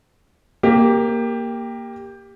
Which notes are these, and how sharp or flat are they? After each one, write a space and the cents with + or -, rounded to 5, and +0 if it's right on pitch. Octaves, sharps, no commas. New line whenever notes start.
A#3 +0 G4 +15